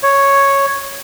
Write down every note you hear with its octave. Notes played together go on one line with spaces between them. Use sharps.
C#5